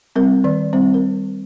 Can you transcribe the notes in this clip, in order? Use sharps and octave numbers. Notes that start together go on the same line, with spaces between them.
G3 C4 A#4
D#3 D5
G3 C4 C5
A#4